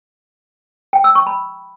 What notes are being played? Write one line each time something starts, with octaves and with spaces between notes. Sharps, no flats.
G5
E6
C#6
B5